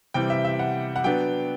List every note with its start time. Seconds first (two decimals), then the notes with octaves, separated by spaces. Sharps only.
0.14 C3 E3 G3 G5
0.30 E5
0.45 E5
0.59 F#5
0.96 F#5
1.04 F#3 B3 D4 G5